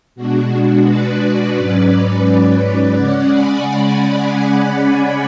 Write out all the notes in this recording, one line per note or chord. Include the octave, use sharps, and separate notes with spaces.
B2 G#3 D4 F#4
B4 D5
G#2 F#3 C#4
C#3 G#3 C#4 D5 F#5
G#5 B5